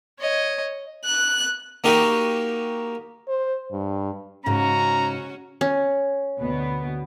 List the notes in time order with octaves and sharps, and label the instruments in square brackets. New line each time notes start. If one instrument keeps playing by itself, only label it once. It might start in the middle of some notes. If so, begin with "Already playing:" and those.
[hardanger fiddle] C#5 D#5
[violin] F#6
[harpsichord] A#3 D#4 F#4 G4
[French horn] C5
G2
[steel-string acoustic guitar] G#2 C#3 [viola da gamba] C#4 F#4 [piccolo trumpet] A#5
[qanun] C#4
[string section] D2 B2 B3